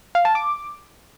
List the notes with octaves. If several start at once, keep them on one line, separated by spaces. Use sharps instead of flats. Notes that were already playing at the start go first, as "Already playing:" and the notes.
F5
A5
D6